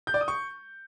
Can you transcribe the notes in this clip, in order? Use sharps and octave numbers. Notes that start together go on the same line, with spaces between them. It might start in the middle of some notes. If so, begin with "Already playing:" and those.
G6
D5
D#6
C#6